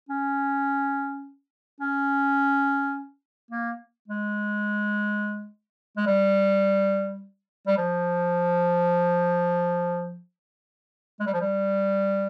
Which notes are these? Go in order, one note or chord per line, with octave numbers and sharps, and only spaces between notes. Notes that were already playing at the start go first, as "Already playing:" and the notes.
C#4
C#4
A#3
G#3
G#3
G3
G3
F3
G#3
G3
F3
G3